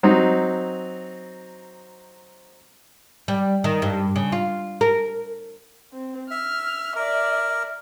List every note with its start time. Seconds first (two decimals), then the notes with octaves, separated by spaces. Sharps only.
0.03 F#3 C4 D#4
3.28 G3
3.64 D#3
3.82 G2
4.16 C#3
4.32 F4
4.81 A#4
5.93 C4
6.31 E5 F6
6.96 A#4 D5 E5